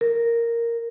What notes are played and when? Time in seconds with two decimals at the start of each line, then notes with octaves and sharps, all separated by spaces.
0.01 A#4